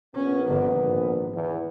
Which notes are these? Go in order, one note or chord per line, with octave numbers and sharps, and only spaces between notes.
A#1 B3 C#4
G1 D3
G#1
E2 E3